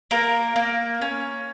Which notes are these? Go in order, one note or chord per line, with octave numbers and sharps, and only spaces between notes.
A#3 A#4
A#3
C#4